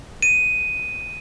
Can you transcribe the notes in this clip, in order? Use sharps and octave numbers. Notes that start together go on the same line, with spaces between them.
D#7